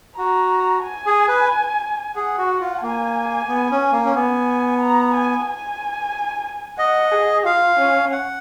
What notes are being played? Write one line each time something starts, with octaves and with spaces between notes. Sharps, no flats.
F#4 A#5
G#5
G#4
B4
G#4 F#5
F#4
F4
A#3 G#5
B3
C#4
A#3
C#4
B3 G#5
A#5
G#5
G#5
D#5 F#5
G#4
F4 F5
C#4
F#5